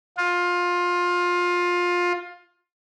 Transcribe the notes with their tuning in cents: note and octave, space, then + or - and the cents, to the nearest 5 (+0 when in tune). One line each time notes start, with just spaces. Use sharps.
F4 +20